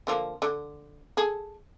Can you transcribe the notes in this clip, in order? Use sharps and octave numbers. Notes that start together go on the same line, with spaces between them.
D3 F3 A#3
D3
G#4 A4